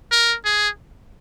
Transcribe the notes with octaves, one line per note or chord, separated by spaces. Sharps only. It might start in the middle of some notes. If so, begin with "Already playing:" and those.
A#4
G#4